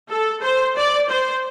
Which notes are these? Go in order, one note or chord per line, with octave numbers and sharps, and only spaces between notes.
A4
C5
D5
C5